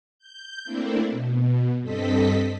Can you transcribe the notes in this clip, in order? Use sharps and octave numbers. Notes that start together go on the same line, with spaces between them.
G6
A3 A#3 C4 D4 E4
B2
G2 C4 A4 D#5 B6